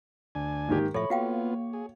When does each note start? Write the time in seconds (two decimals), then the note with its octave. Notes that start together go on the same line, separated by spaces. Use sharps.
0.35 D2 D4 G#5
0.68 G#2 D#3 A#3 G4
0.94 A2 F3 A4 C#5 E5 B5
1.10 A#3 B3 F4 F#4 F5 G5
1.73 G#4